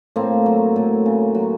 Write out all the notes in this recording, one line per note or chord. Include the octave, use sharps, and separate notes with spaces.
A2 A#3 C4
F#3
A2
C#3
F#3